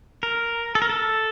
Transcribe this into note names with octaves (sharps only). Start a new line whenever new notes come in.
A#4
A4
A#4
A4